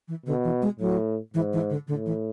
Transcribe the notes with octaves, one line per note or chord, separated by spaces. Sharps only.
E3
B2 D3
E3
G#3
A2 F#3
G#2 E3
E3
D3
A2 D3
E3